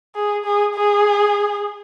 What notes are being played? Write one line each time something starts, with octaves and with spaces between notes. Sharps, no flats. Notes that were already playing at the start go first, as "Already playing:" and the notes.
G#4
G#4
G#4